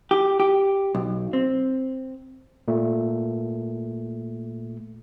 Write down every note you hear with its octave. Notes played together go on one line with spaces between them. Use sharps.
G4
G4
B1
C4
A#2 A3